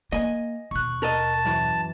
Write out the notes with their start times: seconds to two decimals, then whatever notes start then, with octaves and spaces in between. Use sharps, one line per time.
0.12 A#3 D#5 G#5
0.71 D#2 B2 C#6 F#6
1.03 A#4 D#5 A5
1.45 F#2 E3